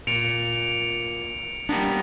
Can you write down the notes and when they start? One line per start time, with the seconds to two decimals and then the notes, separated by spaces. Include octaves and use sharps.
0.07 A#2 C#7 D7 F7
1.69 G3 A#3 B3 D4